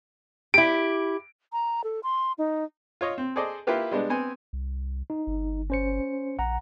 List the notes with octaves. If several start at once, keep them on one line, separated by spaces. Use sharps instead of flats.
E4 G4 D7
A#5
A4
C6
D#4
F4 C#5 D#5
C4
G#4 A4 C5 D5 D#5
A#3 E4 F4 G4 B4
G3 G#3 B3 D4
B3 C4 G#5
C2
D#4
G1
C#4 C5 C#7
A#1 F#5 A#5